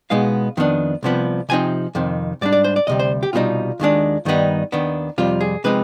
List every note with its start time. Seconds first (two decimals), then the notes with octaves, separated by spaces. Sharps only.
0.10 B2 G#3 B3 D#4 F5
0.57 F2 D#3 B3 D4
1.03 C2 C3 F3 B3
1.49 C3 F3 C4 D#4 G#5
1.95 F2 C3 D#3
2.41 G#2 G3 D4 D5
2.52 D5
2.64 C5
2.76 D5
2.87 D2 C3 G3 D#5
3.00 C5
3.23 G4
3.33 C2 B2 G3 C4 D#4 F4
3.80 D#2 D#3 G#3 D4
4.25 G2 D#3 G3 B3 D#4
4.72 D#2 D#3 B3 D4
5.18 F2 C3 G3 F4
5.41 G#4
5.64 C3 F3 G#3 C4 D#4 B4